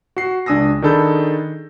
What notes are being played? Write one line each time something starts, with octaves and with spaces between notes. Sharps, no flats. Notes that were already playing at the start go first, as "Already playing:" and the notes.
F#4 C7
C#2 D4 G#5 D#6 E6 A#6
D#3 D4 G#4 A4 B5 G6